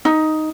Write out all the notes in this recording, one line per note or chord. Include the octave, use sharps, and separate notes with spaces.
D#4